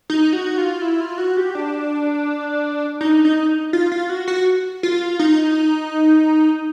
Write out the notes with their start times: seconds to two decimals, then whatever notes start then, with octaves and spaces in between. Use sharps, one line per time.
0.10 D#4
0.33 F#4
0.58 F4
0.81 E4
1.00 F4
1.18 F#4
1.37 G4
1.55 D4
3.01 D#4
3.25 D#4
3.73 F4
3.92 F4
4.09 F#4
4.28 F#4
4.83 F4
5.19 D#4